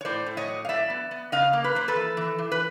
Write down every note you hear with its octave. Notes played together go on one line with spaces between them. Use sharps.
C#5
A2 C5 D5
A2
C#5 D#5
F#3
F5
A2 D5 E5
B3
B3
C#3 D#5 F5
A#3
B4
A#3 C5
A4 B4
E3
E3
E3
B4